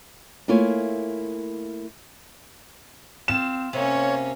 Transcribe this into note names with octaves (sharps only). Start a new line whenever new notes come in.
A3 A#3 E4 F4 C#5 G#5
C4 F4 E7
C3 A#3 C#4 C#5